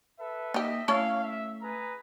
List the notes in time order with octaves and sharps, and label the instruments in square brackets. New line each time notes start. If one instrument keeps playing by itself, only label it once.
[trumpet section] A4 B4 E5
[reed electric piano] A#3 [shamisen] D#4 G4 [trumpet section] D#5 E5
[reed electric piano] A3 [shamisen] C#4 E4 A4 [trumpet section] C#5 F5
[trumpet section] E5
G#4 B4 A#5